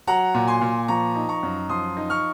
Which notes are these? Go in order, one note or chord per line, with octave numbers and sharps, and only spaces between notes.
F#3 F#5 A#5
A#2
G#5 C6
A#2
F3 A#5 C#6
D#4
A#5 C#6
F#2
F3 C6 D#6
D#4
C#6 F6